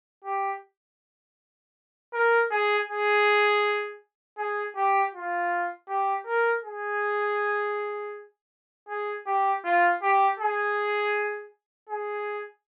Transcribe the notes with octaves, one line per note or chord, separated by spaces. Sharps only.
G4
A#4
G#4
G#4
G#4
G4
F4
G4
A#4
G#4
G#4
G4
F4
G4
G#4
G#4